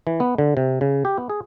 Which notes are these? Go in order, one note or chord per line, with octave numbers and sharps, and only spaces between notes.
E3
B3
D3
C3
C#3
G4
B3
G#4